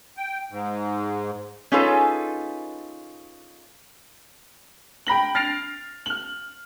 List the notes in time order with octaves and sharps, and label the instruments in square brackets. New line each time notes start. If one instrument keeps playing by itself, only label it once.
[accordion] G5
G#2
[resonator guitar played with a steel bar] C#4 D#4 F4 G#4 A4 B4
[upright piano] G5 B5 A#6 F#7
F6 A6 A#6 C7 D7 F7
F6 F#7